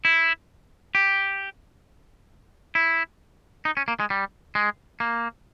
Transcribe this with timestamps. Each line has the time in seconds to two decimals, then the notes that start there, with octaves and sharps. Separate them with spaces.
0.05 E4
0.95 G4
2.75 E4
3.65 D#4
3.77 C#4
3.88 A#3
4.00 G#3
4.10 G3
4.55 G#3
5.00 A#3